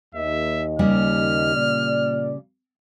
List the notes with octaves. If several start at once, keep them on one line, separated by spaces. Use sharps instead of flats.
D#2 D#5 E5
C#3 G3 A#3 F6
A#2 D5